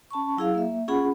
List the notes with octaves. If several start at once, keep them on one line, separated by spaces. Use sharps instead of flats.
C#4 A5 B5 C#6
F#3 E4 G#4 F5
A#3 E5
C#4 F4 G#4 F#5 B5